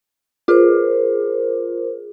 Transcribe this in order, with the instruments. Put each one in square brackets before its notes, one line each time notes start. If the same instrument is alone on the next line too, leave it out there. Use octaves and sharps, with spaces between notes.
[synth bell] F4 G#4 [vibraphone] A#4 C5